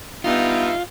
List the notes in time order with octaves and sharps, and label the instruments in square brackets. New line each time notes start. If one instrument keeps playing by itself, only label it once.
[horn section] G2 D#4 E5 [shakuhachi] B3 [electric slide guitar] F4